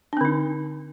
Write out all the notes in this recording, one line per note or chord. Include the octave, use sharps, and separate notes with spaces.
D3 C4 D4 D#4